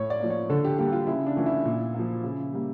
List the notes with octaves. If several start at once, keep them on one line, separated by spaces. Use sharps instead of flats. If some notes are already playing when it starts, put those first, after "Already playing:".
Already playing: A2 C#5
D5
F3 A#3
C#5
D3 A4
G4
G3 A#3 G4
F4
C#3 E4
D4
E3 A3 F4
E4
A#2
F3 A#3
C#3
G3 A#3